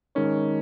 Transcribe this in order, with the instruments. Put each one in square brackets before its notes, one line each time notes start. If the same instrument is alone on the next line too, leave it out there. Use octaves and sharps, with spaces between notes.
[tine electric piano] D#3 G#3 D#4 A#4 C#5 [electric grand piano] C#4